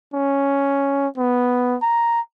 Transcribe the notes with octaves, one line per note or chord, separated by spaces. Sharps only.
C#4
B3
A#5